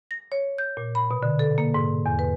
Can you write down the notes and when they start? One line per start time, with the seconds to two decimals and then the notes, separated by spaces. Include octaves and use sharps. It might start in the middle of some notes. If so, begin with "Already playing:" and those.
0.11 A#6
0.32 C#5
0.58 G6
0.77 A#2
0.95 B5
1.11 B2
1.23 D3
1.39 A4
1.58 A#3
1.74 G#2
2.06 E2
2.19 B4